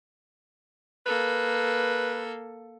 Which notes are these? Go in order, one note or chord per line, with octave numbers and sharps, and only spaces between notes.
A#3 A4 B4